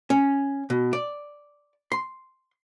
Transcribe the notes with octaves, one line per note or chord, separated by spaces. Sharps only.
C#4
B2
D5
C6